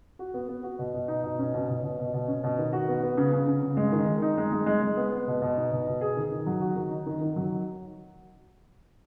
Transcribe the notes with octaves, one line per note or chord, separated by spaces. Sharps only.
F#4
B3
B3
F#4
B2
B2
D#4
B2
C#4
B2
B2
B2
B2
B2
C#4
B2
D#3
F#4
B3
B3
C#3
C#3
C#3
C#3
G#3
D#3
D#3
D#4
G#3
G#3
G#3
G#3
B3
B3
B2
B2
D#4
B2
B2
G#4
D#3
D#3
F#3
F#4
D#3
D#4
D#3
D#3
F#3